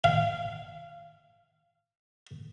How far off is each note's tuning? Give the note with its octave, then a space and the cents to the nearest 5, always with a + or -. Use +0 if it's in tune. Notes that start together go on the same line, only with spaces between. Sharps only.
F5 -20